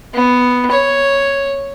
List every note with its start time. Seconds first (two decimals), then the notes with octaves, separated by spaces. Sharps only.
0.14 B3
0.72 C#5